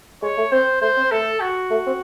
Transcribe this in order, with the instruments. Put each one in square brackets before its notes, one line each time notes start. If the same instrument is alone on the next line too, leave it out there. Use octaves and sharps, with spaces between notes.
[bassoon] G#3 [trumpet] C#5
[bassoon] A3
[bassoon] C4 [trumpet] C5
[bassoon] A3 [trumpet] C5
[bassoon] C4
[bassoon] A3 [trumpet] A4
[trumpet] F#4
[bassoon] A3
C4